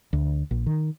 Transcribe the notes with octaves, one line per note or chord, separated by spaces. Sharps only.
D2
A#1
D#3